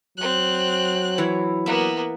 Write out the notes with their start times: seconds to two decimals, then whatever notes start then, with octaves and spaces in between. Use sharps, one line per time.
0.17 F#3 C4 F#6
1.18 E3 E4 C#5
1.66 A#3 B3 E5 F#5